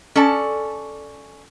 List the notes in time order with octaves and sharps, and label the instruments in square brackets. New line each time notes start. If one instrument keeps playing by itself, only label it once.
[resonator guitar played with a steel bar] C#4 A4 D5 A5